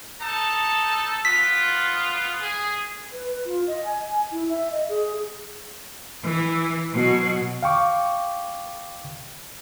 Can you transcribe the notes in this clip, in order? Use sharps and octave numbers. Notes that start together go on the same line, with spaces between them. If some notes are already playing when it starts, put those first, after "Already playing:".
D#4 A4 A5
B3 F4 B6
G#4
B4
F4
D#5
G#5
E4
E5
D#5
G#4
E3
B2 F#3
F5 G5 C#6 D6